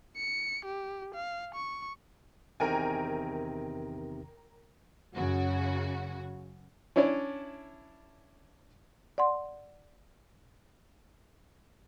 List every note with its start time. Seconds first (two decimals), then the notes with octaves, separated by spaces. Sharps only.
0.17 C#7
0.65 G4
1.14 F5
1.54 C#6
2.60 E2 C3 D#3 A#4 G5 G#5
5.15 F#2 C#3 F#4
6.96 C#4 D4 E4 C#5 D5
9.18 D5 F#5 C6